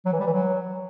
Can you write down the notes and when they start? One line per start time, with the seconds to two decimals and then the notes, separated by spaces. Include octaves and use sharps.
0.06 F#3
0.13 E3
0.20 G3
0.27 E3
0.33 F#3